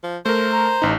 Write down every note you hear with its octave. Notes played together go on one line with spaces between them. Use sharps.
F3
A3 A#4 C5
A#5
A1 D#4